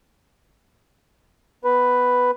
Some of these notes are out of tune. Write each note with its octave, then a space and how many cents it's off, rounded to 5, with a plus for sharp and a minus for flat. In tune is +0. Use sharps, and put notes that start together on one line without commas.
B3 +0 B4 +5